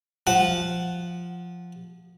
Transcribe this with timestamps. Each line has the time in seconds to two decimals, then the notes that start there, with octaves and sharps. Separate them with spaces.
0.27 F3 F#5